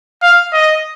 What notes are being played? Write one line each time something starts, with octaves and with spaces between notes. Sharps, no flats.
F5
D#5